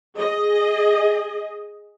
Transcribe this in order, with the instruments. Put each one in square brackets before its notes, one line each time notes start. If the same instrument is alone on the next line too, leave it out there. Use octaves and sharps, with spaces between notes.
[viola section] G#4 D#5